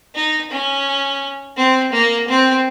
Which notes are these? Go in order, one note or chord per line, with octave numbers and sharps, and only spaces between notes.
D#4
C#4
C4
A#3
C4